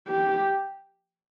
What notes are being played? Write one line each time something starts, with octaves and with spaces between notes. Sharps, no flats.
G4